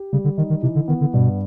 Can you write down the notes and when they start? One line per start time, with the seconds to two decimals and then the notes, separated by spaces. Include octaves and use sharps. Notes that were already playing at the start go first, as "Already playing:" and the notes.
Already playing: G4
0.13 C#3 G3
0.24 D3
0.38 D#3 D#4
0.50 D#3
0.62 C3 E3
0.75 D3
0.88 D#3 B3
1.01 D3
1.14 G2 B2